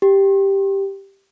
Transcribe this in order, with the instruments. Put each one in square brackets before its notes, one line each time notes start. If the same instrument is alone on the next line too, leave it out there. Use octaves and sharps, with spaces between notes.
[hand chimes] G4